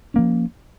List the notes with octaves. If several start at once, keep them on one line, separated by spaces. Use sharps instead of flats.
F3 A#3 C#4